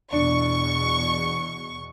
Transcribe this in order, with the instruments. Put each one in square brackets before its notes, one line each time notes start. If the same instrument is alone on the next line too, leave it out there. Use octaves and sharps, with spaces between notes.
[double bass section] E2 B2 [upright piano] D4 [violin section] C#6